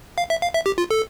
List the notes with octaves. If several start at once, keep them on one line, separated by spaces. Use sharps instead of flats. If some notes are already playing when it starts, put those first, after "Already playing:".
F5
E5
F5
E5
G4
F4
A4